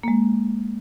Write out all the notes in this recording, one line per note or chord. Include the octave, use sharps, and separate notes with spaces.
G#3 A#3